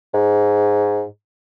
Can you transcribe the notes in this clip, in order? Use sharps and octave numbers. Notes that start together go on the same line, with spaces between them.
G#2